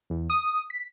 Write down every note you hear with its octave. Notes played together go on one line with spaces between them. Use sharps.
E2
D#6
B6